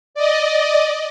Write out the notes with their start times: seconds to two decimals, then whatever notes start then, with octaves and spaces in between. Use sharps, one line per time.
0.15 D5 D#5